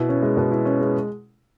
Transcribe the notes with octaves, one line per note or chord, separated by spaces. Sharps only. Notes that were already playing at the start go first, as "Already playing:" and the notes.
Already playing: B2 E4
C#4
G#3
B2
E4
C#4
G#3